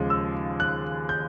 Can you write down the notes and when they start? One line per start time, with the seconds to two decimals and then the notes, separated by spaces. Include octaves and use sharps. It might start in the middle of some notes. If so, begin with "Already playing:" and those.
Already playing: D#2 C#3 F3 G#3
0.10 E6
0.60 F#6
1.09 G6